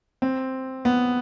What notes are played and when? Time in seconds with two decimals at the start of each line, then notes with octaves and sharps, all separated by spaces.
0.22 C4
0.85 B3